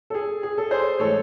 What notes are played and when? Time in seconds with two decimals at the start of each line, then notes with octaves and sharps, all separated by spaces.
0.10 A4
0.14 G#4
0.43 G#4
0.58 A4
0.71 G#4 C5
0.99 A2 E3 G#3 A4 C#5